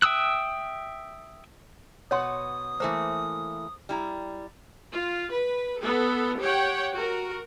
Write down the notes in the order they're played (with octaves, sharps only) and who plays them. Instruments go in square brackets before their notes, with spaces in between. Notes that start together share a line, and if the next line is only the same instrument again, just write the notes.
[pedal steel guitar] E5 G5 D#6 E6 F#6
[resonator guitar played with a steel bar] B2 B4 F#5 [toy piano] C#5 C6 [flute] D#6
[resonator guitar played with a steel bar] E3 A3 A#3 [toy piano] C5
[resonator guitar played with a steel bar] G3 E4 A#5
[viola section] F4
B4
B3 A4
G4 C#5 F#5 G5
F#4 A#4